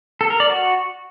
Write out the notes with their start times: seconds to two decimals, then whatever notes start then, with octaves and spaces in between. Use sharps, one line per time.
0.21 A4
0.30 A#4
0.40 D5
0.50 F#4